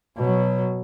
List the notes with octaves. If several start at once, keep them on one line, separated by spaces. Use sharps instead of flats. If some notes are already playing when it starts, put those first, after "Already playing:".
B2 F#3